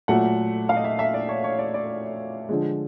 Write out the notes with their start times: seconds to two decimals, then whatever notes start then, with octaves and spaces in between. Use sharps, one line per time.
0.08 A#2 F#3 A3 F#5
0.69 F5
0.77 D#5
0.84 E5
0.99 E5
1.14 D5
1.29 C#5
1.44 C#5
1.59 D5
1.74 D5
2.49 D3 F3 G#3